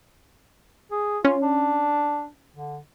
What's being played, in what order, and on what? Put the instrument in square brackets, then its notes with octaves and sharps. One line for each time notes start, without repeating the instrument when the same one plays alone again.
[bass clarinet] G#4
[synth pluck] C#4 [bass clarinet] F4
[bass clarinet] D4
D3